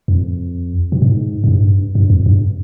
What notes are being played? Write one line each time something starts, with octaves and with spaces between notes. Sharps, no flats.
F2
B2
G#2
G#2
G2
G2
F2
G2